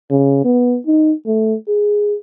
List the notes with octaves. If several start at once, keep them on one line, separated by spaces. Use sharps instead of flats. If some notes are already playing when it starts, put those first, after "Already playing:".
C#3
B3
D#4
A3
G#4